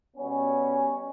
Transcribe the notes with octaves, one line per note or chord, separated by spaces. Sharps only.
B2 G3 B3 C#4